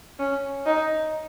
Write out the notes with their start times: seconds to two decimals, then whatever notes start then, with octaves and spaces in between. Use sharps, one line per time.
0.19 C#4
0.66 D#4